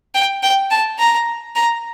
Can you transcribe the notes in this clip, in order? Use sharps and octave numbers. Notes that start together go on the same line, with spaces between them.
G5
G5
A5
A#5
A#5